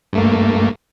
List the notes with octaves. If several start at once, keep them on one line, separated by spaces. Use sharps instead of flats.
G2 A3 A#3